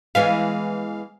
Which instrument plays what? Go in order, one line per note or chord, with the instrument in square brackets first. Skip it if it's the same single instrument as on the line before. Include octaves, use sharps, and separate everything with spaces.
[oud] E3 G#3 B3 [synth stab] F5